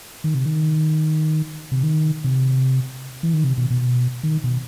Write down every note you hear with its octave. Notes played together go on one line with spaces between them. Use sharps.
D#3
C3
D#3
C3
D#3
C3
E3
D#3
C3
B2
B2
D#3
B2